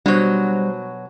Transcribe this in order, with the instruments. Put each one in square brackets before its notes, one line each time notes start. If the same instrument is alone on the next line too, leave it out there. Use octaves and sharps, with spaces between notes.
[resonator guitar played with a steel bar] B2 F#3 [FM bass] G3 [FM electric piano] D4 C5